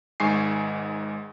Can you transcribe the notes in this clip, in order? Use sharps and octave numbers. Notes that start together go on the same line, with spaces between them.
G#1 G#2 G#3 G#5 C#6 C7